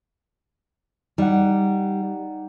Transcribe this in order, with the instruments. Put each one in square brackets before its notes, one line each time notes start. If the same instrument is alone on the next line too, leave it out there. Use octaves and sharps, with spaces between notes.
[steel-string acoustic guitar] G3 [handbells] D#4 F#5